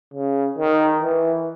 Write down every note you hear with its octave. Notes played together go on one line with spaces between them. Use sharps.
C#3
D#3
E3